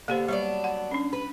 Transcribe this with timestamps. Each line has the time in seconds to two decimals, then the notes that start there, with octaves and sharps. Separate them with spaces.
0.08 D3 A#3 B3 G4 C5
0.28 F#3 G3 B3 D4
0.64 F#5
0.91 C#4 D4
1.13 B4